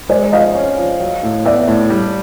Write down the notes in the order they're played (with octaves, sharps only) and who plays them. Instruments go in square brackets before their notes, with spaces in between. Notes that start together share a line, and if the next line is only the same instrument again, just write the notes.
[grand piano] G#3 [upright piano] C5 D5
[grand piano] F3 [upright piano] D#5 F5
[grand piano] C#4
F3
F#3
A2
[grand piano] B3 [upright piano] D5 E5
[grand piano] A2
G3